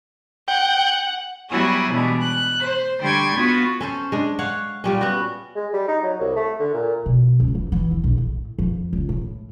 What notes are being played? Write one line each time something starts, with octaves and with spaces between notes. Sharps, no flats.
F#5 G5
F#3 G3 B3 E4 F#4 G#4
B2 E3 G3 G#3 D4
F#6
C5
D3 G3 G5 C6 C#6 G#6
B3 F4 F#4
C#4 A4 C5
G#3 D4
C#5 F5 F#5
A#2 G3 C#4
B3 F#4
G#3
G3
D#4
F#3
C2
A3
D3
A#2
B2
C#2
E3
E3
E2
A#1
A2
F2
C#2
A2